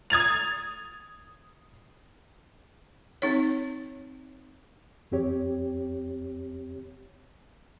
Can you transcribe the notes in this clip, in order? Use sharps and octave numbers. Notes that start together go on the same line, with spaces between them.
D#6 G#6 A6 F7
C4 D#4 C#5
F2 C4 G4 C#5